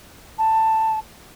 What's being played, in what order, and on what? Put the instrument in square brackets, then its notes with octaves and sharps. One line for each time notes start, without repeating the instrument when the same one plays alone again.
[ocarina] A5